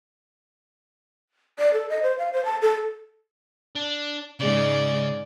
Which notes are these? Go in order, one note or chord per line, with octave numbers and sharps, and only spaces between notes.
D5
A4
D#5
C5
F5
C5
A5
A4
D4
G#2 C#3 G#3 D5